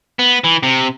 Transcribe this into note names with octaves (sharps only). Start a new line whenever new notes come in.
B3
E3
C3